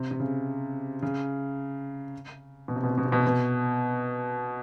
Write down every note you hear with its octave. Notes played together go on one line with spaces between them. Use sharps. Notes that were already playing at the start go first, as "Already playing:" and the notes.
Already playing: C3
C3
C#3
C#3
B2
C3
B2
C3
B2
C3
B2
C3
B2